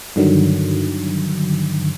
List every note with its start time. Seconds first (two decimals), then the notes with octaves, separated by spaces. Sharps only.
0.16 G2 D3 D#3 F#3